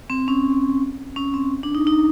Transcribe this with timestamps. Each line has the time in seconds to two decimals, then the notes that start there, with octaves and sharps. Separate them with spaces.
0.10 C4
0.28 C#4
1.16 C#4
1.34 C4
1.63 D4
1.75 D#4
1.87 D#4